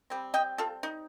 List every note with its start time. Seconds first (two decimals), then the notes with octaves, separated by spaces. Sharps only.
0.10 G3 C4
0.34 D#5 G5
0.58 F4 A4
0.83 D#4